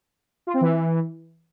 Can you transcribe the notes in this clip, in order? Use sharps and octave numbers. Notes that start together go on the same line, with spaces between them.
F4
C4
E3